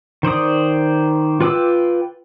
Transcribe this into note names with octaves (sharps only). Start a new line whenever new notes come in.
D#3 C5 D5 D#6
F4 B4 G5 D6 E6